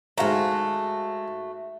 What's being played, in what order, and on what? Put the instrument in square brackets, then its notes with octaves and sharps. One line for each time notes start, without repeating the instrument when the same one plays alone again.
[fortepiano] G#2 F5 A#5 [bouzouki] A3 F#4